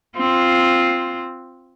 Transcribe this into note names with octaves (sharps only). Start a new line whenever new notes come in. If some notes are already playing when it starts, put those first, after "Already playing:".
C4 F4